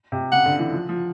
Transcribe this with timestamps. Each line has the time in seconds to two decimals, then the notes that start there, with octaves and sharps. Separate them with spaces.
0.12 C3
0.32 C#3 F#5
0.45 D3
0.59 E3
0.73 F3
0.89 F3